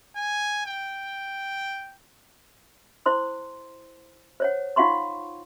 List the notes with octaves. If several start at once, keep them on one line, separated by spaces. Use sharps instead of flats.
G#5
G5
E4 C5 C6 D#6
C5 C#5 F#5
D#4 F4 F5 F#5 C6 C#6